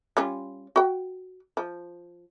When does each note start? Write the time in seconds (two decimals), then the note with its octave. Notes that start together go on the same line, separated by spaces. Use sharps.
0.17 G3 C#4 F4
0.76 F#4 G5
1.57 F3